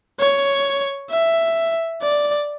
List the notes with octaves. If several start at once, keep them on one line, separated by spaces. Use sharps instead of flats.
C#5
E5
D5